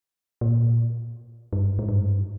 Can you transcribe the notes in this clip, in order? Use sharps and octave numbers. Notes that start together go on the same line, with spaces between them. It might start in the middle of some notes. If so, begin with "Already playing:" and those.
A#2
G2
G#2
G2